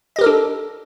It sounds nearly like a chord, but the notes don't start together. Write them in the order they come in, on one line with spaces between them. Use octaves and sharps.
D#5 G4 A#4 A4 D4